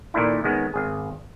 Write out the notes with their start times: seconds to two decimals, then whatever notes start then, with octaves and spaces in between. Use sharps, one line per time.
0.14 A#2 D#3 A3 D4 E4
0.44 D#3 G#3 B3 C#4
0.74 G#1 G#4